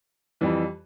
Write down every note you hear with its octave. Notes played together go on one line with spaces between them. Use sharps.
F2 E3 G3